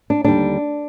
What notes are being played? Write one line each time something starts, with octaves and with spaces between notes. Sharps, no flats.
D4
D#2 D3 G3 D4